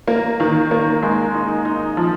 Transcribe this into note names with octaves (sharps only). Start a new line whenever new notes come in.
A#3
D#3
A#3
G#3
D#4
D#4
F3